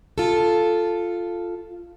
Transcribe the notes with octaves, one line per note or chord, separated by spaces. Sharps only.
F4 A4